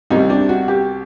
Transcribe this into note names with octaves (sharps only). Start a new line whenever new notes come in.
C2 C3 G3 D#4
D4
F#4
G4